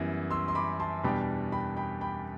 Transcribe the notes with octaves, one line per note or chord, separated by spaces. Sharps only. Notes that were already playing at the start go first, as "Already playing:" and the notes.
Already playing: F#2 E3 G3 B3
C6 E6
C6
B5 D6
A5 C6
E2 B2 G3 D4 G5 B5
G5 B5
G5 B5
G5 B5